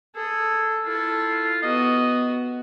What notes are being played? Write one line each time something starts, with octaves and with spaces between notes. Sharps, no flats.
G#4 A4
E4 F4 A4
B3 F#4 D#5